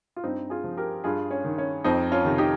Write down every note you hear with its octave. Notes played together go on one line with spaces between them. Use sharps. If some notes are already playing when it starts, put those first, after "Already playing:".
F4
G2 C4 D#4
F4 G#4
F3
G4 A#4
G2 F4 G#4
C#4
D#3
C#4
F2 C4 D#4
C#4 F4
C3 D#3
D#4 G4